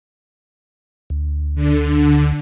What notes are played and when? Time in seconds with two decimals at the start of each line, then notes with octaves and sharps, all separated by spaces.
1.10 D2
1.55 D3